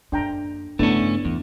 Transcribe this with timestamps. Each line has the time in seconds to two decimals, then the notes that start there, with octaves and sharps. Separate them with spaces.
0.12 F#2 A#3 D4 G5 A#5
0.79 G2 C#3 A3 B3 C#4 D4 E4
1.25 E2 C3